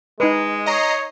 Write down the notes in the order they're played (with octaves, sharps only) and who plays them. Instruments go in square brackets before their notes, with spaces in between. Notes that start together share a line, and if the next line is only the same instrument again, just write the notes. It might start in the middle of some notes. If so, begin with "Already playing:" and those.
[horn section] G#3 [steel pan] D#4 B4
[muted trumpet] C#5 [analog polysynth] D#5 A#5 C7